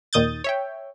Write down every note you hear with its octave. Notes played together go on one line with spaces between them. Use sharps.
D#2 A#2 D#3 D#6 G6 A6
C#5 E5 G5